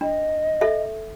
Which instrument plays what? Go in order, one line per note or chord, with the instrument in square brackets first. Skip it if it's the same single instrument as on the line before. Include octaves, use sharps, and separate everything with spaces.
[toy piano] D4 [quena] D#5
[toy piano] A4 E5